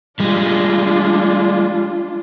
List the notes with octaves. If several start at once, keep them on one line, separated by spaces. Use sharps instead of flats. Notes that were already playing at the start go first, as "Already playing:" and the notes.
G3 G#3 D4 F4